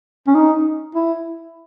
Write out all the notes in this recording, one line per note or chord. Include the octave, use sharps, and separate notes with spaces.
C#4
D#4
E4